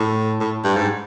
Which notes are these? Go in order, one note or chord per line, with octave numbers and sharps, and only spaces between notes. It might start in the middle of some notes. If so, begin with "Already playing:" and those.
Already playing: A2
A2
G2
G#2